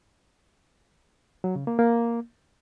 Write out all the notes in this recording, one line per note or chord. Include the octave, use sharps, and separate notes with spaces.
F#3
C#3
A#3
A#3